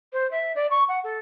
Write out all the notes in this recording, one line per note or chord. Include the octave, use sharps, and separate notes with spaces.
C5
E5
D5
C#6
F#5
A4